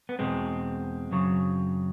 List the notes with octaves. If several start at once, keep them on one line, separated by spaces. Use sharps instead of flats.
B3
E2 B2 G#3 C4
F#2 C#3 F#3